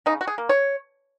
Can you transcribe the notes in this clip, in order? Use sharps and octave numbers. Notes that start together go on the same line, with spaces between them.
C#3 D#4
F#4
G#4
A#3
C#5